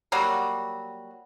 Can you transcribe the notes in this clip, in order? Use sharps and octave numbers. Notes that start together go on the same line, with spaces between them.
F#3 G3 A#3 F#4